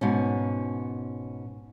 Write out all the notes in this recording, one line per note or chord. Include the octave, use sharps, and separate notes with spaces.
G#2 B2 C#4